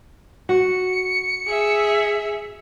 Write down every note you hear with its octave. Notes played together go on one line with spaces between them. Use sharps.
F#4 C#7
G#4 E5